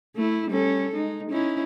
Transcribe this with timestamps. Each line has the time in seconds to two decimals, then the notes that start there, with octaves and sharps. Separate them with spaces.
0.15 A3 E4
0.49 G3 C#4 A4
0.94 G#3 D#4
1.30 C#4 D#4 E4